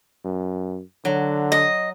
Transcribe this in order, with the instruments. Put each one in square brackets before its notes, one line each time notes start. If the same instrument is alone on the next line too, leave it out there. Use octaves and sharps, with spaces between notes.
[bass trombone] F#2
[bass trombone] D3 [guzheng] F#3
[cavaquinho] D#5